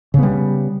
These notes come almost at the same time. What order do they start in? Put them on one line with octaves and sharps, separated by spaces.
C#3 B3 G3